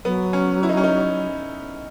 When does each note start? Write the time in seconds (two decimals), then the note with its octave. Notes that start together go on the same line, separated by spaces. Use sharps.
0.04 F#3 B3
0.33 C#4
0.63 E4
0.69 D#4
0.77 C#4
0.84 D#4